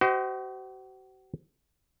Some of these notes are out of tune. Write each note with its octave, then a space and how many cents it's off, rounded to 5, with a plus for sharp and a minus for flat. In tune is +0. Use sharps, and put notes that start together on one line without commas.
F#4 +40 C5 -25 D#5 +0